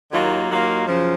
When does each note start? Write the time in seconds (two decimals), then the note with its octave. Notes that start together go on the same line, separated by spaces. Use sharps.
0.12 D#2 D#3 F#3 A#3 F4
0.49 D#2 D#3 F#3 A#3 F4
0.87 F#2 C#3 F3